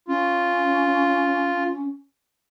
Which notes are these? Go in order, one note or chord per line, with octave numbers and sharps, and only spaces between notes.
C#4 F4